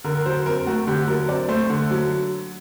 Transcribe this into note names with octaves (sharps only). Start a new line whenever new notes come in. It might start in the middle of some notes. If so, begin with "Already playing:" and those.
D3 A#4
A#4
F#3 C5
C4 A#4
A3 F#4
D3 G4
F#3 A#4
C4 D5
A3 C5
D3
F#3